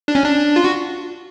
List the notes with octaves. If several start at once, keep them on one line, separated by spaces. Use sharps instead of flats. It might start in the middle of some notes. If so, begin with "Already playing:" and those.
D4
C#4
D4
F4
F#4